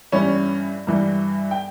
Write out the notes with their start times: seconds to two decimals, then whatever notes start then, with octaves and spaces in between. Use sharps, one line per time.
0.12 G2 E3 G3 C#4 C#5
0.87 G2 E3 G3
1.51 G5